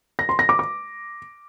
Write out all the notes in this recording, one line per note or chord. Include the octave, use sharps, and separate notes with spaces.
A#6
C6
A#6
D6
D6